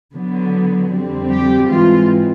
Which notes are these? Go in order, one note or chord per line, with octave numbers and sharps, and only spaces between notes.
D3 F#3 B3
F2 D3 G3 C4
G4
G#2 E3 G#3 C4 F4